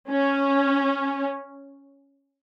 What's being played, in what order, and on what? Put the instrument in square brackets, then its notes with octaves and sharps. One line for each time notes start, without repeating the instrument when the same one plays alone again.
[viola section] C#4